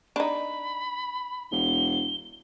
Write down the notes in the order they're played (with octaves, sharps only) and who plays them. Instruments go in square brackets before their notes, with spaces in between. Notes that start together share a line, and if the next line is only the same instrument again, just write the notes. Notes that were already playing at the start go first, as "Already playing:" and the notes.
[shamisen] D4 D#4 [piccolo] B5
[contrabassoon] E1 [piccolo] G7